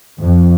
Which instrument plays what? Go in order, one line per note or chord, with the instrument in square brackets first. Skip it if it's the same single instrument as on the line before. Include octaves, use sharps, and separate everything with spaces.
[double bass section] F2